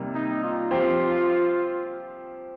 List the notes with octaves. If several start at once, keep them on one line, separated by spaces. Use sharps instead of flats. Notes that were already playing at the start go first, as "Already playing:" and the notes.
Already playing: C3 D#3 G3 A#3
D#4
F4
F3 C4 G4 C5